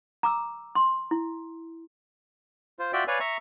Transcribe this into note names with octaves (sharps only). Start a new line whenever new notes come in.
A#5 D6 E6
C6
E4
F4 C5
F4 F#4 D5 E5 G5
B4 C#5 D5 F5 G#5
E5 A#5 C#6